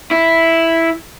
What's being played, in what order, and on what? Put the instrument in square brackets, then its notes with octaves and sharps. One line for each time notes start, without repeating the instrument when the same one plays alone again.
[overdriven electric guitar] E4